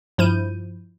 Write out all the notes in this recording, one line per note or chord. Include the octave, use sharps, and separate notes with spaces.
G2 F3 E4 G6 D#7